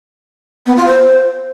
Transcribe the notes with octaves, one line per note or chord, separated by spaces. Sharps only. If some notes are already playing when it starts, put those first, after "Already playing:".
B3
F4
C5